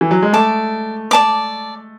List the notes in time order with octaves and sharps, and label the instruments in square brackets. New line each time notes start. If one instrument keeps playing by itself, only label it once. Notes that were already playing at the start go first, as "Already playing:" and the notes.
[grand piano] E3
F#3
G#3
[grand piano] A3 [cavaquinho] D5 A5 D6
[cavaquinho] D5 A5 D6